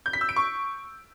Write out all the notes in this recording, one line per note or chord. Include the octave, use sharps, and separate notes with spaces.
G6
B6
E6
D7
C#6